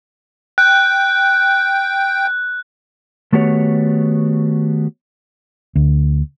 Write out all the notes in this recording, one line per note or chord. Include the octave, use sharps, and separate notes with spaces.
G5 F#6
D#3 A3 B3 F#4 G4 C#5
D2